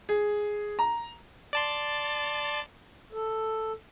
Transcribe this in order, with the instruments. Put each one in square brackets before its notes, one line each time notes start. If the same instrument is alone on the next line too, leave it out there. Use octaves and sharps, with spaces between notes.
[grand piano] G#4
A#5
[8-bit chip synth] D5 A5 C6
[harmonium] A4